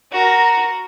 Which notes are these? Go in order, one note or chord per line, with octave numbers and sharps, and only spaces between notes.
F#4 A#4